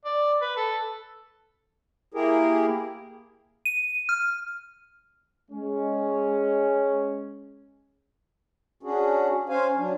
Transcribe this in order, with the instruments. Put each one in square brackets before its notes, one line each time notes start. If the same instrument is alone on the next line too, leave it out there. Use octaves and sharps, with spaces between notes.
[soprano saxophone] D5
B4
A4
[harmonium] A#3 E4 G4 G#4 A#4
[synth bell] D#7
F6
[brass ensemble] G#3 C#4
[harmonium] C#4 D4 F#4 G#4
C#4 C5 F5 G#5
F#3 D4